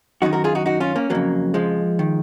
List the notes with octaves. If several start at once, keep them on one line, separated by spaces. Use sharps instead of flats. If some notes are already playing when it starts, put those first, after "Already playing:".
F#2 D#3 D#4 F#4
F#4 A#4
F4 G#4
D#4 F#4
D#4 F#4
C#4 F4
A#3 C#4
F2 C#3 F#3 A#3
F3 G#3
D#3